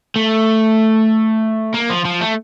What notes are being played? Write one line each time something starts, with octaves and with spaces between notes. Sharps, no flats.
A3
A#3
F3
F3
A3